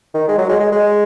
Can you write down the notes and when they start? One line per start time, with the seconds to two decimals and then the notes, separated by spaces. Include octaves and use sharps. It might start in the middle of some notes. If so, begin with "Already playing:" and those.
0.14 D#3
0.28 G#3
0.38 F#3
0.49 G#3
0.60 G#3
0.72 G#3